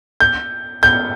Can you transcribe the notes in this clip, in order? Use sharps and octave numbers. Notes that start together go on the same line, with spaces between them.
G6
G6